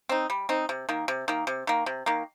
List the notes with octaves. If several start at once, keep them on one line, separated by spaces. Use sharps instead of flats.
C4 D#4
G3
C4 D#4
C3
D#3 A#3
C3
D#3 A#3
C3
D#3 A#3
C3
D#3 A#3